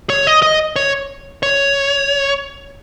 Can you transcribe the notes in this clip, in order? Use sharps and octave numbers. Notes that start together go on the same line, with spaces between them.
C#5
D#5
D#5
C#5
C#5